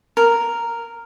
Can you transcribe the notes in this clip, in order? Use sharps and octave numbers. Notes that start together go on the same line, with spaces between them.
A#4